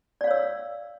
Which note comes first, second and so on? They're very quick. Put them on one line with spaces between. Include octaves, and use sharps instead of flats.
D5 F5 C#5 E6